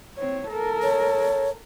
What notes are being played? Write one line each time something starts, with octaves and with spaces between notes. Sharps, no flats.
C4 C#5
A4 A#4
C#5